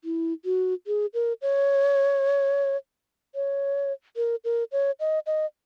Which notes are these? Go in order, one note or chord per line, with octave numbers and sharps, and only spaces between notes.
E4
F#4
G#4
A#4
C#5
C#5
A#4
A#4
C#5
D#5
D#5